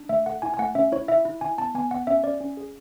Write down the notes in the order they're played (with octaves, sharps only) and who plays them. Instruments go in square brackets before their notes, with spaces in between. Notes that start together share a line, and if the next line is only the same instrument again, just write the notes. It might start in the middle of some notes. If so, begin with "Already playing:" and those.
Already playing: [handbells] D4
A3 E5
A4 F#5
E4 G#5
G#5
A3 F#5
C#4 E5
E4 C#5
E4 E5
E4
E4 G#5
B3 A5
B3 G#5
B3 F#5
C#4 E5
C#4 D5
C#4
G#4